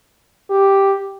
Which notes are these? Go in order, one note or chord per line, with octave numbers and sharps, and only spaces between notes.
G4